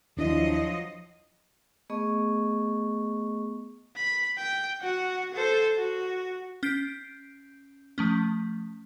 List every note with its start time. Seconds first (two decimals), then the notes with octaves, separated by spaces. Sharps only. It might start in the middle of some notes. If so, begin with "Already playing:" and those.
0.17 D#2 F3 F#3 D4 E4 D#5
1.90 A3 B3 G#4 D#5 C#6
3.97 B5
4.38 G5
4.80 F#4 F#5
5.34 A4 C5
5.78 F#4
6.63 C#4 G6 C7 D7
7.98 F3 A3 C#4